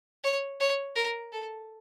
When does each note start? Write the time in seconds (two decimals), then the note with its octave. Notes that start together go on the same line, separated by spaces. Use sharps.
0.24 C#5
0.60 C#5
0.95 A#4
1.32 A4